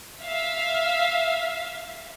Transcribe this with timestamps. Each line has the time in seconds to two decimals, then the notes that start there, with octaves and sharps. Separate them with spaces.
0.22 E5 F5